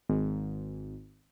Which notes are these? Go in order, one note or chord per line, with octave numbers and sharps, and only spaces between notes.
G#1